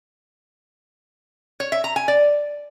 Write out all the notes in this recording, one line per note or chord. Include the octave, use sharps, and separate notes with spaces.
C#5
E5
A#5
G#5
D5